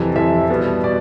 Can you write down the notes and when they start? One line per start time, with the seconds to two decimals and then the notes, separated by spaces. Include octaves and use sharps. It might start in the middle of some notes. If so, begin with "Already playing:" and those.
Already playing: F2 C3 E3
0.16 F2 C3 E3 E5
0.50 B2 G3 B3
0.84 B2 D5